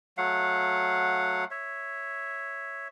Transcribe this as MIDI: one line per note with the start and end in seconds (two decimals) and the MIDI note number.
0.18 1.44 54
0.18 1.44 57
0.18 1.44 77
0.18 1.44 78
1.51 2.88 73
1.51 2.88 76